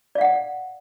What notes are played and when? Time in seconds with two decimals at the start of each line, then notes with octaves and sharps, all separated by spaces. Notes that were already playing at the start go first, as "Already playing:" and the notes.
0.15 D5
0.18 F5
0.21 F#5